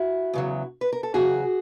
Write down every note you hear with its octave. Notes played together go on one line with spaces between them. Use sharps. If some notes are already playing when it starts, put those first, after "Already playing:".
Already playing: E4 F#4
E2 C#3 F#3
B4
A#4
A4
E2 C#3 F#3 F#4 G#4